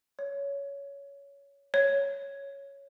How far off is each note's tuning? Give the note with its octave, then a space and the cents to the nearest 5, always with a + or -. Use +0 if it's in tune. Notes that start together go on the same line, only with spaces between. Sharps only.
C#5 +15
C#5 +0